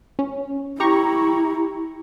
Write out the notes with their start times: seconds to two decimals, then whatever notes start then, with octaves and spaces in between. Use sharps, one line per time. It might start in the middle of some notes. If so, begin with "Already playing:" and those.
0.19 C#4
0.80 E4 G4 A#5 C#6